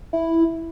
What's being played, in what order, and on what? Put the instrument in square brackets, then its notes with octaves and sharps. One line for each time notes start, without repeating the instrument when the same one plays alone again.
[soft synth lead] E4